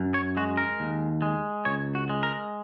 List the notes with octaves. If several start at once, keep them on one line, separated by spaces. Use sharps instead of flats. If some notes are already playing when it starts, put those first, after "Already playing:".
Already playing: F#2
C#5
G#3 F#4
A#4
D#2
G#3
C#2 C#5
F#4
G#3
A#4